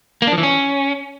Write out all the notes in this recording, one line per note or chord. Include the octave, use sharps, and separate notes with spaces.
A#3
D4
F3
E3
C#4